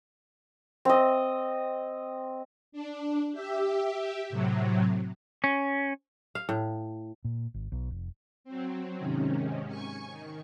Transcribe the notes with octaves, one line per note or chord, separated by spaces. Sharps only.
C4 D#5
D4
G4 E5
A2 C3 F#3
C#4
F5
A2
A#2
G#1
B1
F1
F#3 C4
G#2 C3 D#3 C#4
G#5 C#6 C#7
D#3